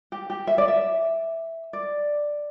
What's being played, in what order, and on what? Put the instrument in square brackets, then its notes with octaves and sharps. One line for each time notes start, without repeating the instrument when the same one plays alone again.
[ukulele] G4
G4
E5
D5
E5
D5